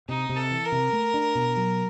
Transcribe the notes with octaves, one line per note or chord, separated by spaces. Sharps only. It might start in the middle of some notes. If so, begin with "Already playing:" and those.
C3 D#4
C3
A4
E3
A#4
C3
A3
D4
B2
F#3